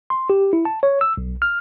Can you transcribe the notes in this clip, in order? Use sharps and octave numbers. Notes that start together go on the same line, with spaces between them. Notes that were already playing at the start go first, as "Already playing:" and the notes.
C6
G4
E4
A5
C#5
E6
B1
F6